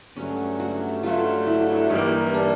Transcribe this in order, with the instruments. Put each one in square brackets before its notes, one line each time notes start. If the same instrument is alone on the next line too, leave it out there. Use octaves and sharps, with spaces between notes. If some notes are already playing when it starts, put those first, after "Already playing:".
[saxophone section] G2 D3 F#3 A3 [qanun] C#4
[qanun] F#4
[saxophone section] G2 D3 F#3 A3 [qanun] F4
[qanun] E4
[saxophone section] G2 E3 G3 A#3 [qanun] D#4
[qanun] D4